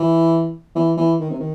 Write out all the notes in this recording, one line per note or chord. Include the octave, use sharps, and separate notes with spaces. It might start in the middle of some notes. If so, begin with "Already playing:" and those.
Already playing: E3
E3
E3
D#3
C3
D#3